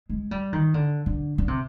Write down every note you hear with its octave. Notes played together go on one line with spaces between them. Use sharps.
G#3
G3
D#3
D3
D3
D3
C3